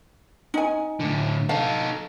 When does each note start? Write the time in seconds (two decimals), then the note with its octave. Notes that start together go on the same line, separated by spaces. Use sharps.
0.54 D#4 G#5
1.00 A2 D3
1.49 D#4 A4 F5